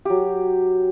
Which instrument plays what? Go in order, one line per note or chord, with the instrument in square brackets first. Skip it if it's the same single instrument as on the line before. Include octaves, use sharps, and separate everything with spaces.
[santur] F#3 G4